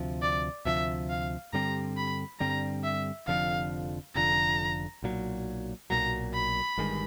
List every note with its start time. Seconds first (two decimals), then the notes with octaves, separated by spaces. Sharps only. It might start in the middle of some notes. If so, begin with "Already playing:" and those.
Already playing: D2 C3 F3
0.22 D5
0.65 D2 C3 F3 E5
1.10 F5
1.53 G2 D3 G3 C4 A#5
1.97 B5
2.40 G2 D3 G3 C4 A#5
2.84 E5
3.27 F1 F2 D3 F3 F5
4.15 F1 F2 D3 F3 A#5
5.02 B1 A#2 F#3
5.90 B1 A#2 F#3 A#5
6.34 B5
6.78 G1 G2 D#3 G#3